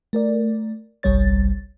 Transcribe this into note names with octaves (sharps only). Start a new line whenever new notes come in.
A3 A#4 D5
G1 C2 G3 C#5 A6